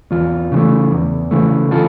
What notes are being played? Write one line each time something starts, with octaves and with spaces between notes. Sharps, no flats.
E2 F4
C#3 E3 A3
E2
C#3 E3 A3
E3 F4 A4